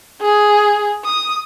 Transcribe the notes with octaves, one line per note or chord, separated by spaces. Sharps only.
G#4
D#6